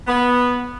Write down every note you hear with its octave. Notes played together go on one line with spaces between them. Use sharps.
B3